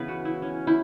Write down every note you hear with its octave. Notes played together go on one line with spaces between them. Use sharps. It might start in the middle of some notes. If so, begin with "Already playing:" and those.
Already playing: C#3 E3 B3 B4
F#4
E4
C#4
E4